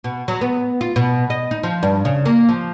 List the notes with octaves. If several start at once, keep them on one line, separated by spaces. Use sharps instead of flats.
B2
F#3
B3
F4
B2
D#5
D#4
F3
G2
C#3
A#3
F3